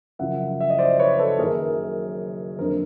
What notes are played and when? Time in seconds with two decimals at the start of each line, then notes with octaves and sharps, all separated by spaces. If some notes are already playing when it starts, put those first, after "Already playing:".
0.19 F#2 C#3 F3 E5 F#5
0.60 E5
0.70 D#5
0.79 C5 D5
0.99 B4 C#5
1.19 A4 B4
1.39 F#1 F#2 D#3 G#4 A#4
2.59 F#1 F2 D3 A#4 C5